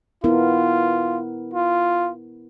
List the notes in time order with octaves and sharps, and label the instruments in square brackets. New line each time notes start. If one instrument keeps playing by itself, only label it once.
[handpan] B3 E4 A#4 [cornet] F4
[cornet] F4